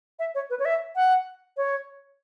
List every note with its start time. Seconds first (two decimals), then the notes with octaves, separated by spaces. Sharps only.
0.19 E5
0.35 C#5
0.50 B4
0.59 C#5
0.65 E5
0.96 F#5
1.57 C#5